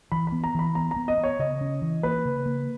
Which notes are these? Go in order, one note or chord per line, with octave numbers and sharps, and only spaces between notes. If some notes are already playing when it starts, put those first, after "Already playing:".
E3 B5
B5
B3
A#5
E3 B5
B3 A#5
A#5
B3
D#5
B3
C#5
C#3 D#5
C#4
E3
A#3 B4
C#3
A#3